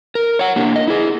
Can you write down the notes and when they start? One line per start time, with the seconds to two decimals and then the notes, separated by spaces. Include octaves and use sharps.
0.15 A#4
0.39 C#5 F#5
0.56 A#3 D4 G4
0.76 D#5
0.88 E4 G#4